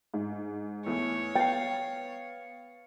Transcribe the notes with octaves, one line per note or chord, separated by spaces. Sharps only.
G#2
E2 E3 A3 C#5
B3 F5 G5 A6